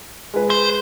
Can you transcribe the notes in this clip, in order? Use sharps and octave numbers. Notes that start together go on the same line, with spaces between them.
G#3 B4
C5